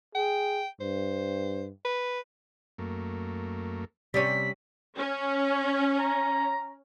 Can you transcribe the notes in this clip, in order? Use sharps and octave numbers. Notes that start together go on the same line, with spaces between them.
G#4 G5
G2 C5
B4
F#2 A3 A#3
C3 G3 C#4 D5 B6 D#7
C#4
A#5